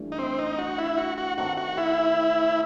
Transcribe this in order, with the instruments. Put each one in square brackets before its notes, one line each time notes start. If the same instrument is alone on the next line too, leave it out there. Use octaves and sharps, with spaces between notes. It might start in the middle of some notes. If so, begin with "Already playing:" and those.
Already playing: [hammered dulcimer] G2 E3 A3
[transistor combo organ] D#4
C4
D#4
F#4
E4
F#4
F#4
[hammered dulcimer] D#3 A3 C4 [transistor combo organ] F#4
[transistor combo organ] F#4
E4